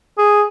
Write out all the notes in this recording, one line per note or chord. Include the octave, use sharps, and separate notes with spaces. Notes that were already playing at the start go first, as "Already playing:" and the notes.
G#4